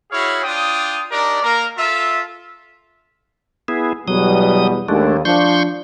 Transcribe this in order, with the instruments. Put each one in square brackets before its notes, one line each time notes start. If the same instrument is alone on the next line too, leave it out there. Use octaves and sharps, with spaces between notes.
[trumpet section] E4 F#4 G#4 C#5 F5
D4 F4 G5 D#6
D4 D#4 G4 A#4 D5
A#3 A#4
F4 A4 E5
[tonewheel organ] B3 E4 G#4
[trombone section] E2 B2 G3 [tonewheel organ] F#3 D#6
[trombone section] D#2 [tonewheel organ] G#3 A3 D4
[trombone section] F3 D4 [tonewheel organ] C6 C#6 G6